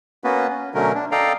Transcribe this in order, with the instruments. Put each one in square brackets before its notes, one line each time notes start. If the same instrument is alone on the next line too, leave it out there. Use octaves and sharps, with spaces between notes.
[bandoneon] A#3 B3 C#4 F#4 B4
C#4
B2 D3 F#3 A3 C#4 A#4
D4
A4 D5 D#5 F5 G5 A#5